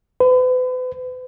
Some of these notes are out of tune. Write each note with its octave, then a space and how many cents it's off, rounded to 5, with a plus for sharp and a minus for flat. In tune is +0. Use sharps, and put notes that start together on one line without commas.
B4 +40